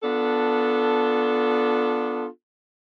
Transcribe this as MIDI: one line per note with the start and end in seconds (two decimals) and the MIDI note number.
0.03 2.26 59
0.03 2.26 62
0.03 2.26 65
0.03 2.26 69